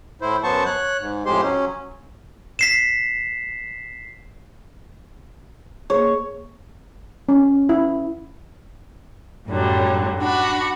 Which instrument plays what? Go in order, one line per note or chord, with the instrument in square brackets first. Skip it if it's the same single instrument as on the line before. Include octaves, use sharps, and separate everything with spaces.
[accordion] A2 E4 C5
F#2 F#3 B3 C5 A5 C#6
C#5 F#6
G#2
F2 A2 G#3 G4 C5 C6
F#3 C#4
[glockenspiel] B6 C7 E7
[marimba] A#3 G#4 [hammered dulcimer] C#5
[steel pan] C#4
E4
[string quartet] F#2 A2 D3 F#3 G3
D4 F#4 B5